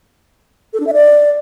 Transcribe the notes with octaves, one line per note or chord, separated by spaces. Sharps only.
A4
D4
E5
D5